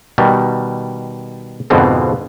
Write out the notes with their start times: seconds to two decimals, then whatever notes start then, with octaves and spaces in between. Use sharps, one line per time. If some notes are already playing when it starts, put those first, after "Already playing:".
0.18 B2 D#3 G3
1.70 F2 G#2 B2 D3 B3 C4